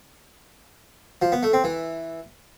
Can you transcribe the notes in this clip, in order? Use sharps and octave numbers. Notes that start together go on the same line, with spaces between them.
F3
B3
A3
C4
E3